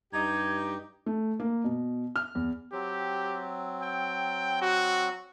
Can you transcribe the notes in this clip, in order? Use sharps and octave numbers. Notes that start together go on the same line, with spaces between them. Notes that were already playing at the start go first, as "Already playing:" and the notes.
G2 D#4 G4 G#6
A3
A#3
B2
F6
E2
F#3 C4 G4
G5
F#4